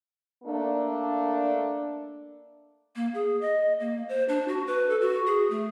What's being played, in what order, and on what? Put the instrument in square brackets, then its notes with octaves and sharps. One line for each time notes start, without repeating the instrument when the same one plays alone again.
[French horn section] A3 A#3 D4
[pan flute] A#3
G#4
D#5
A#3
C5
D4
F#4
B4
A4
F#4
G#4
A3